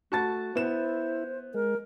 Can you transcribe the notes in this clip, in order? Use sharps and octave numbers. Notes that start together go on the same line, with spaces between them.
A3 F#4 A5 A6
B3 E4 C5 E7
G#3 A#4